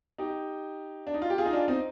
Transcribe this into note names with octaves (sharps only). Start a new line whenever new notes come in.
D#4 G4
D4
D#4
F4
G4
F4 G#4
D#4
D4 F4
C4 D#4